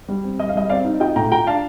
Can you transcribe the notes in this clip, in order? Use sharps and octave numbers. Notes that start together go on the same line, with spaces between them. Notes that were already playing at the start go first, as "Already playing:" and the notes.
G3
C4
G3 D#5
F5
G3 D#5
C4 D5 F5
D#4
F4 D#5 G5
A2 G5 A#5
F4 G5 A#5
D4 F5 A5